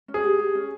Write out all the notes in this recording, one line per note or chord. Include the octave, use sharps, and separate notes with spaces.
C#4
G#4
G4
G4
C#4